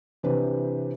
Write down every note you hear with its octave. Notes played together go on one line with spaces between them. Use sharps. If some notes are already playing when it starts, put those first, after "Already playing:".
C3 E3 C4 D4 B4